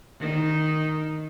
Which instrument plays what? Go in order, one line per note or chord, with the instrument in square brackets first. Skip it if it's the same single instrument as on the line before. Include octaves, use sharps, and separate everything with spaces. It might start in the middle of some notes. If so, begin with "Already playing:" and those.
[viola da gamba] D#3 D#4